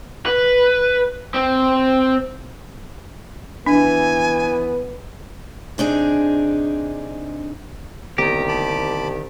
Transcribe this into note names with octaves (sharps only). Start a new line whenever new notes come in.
B4
C4
E3 B3 D4 G#5
C3 D4 D#4 G#4
C2 D3 D#3 A#3 B3 G4 A#5
A5 B5 D6